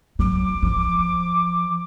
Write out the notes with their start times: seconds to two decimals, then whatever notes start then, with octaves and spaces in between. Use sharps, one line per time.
0.19 F#3 D6
0.62 F3